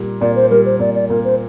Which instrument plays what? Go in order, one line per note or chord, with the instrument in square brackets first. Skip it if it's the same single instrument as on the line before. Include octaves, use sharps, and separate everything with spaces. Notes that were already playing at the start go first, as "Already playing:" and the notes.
Already playing: [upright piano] A#2 G3
[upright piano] A#2 [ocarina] D5
[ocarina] C5
[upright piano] G3 [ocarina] A#4
[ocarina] C5
[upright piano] A#2 [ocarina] D5
[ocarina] D5
[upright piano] A#2 [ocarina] A#4
[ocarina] C5